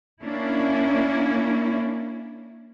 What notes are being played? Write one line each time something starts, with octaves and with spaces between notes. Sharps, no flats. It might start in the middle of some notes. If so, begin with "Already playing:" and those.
A#3 C#4 D4 E4